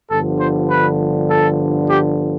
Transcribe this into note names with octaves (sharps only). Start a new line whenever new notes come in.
G1 G2 D3 F3 A4
C5
B4
A4
G4